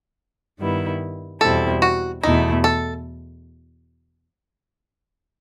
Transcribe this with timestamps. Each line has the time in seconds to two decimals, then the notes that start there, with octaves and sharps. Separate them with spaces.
0.59 G2 D#3 G3 B3 E4
1.41 E2 B2 G3 C4 E4 A4
1.82 F#4
2.23 E2 B2 A3 D#4 E4
2.64 A4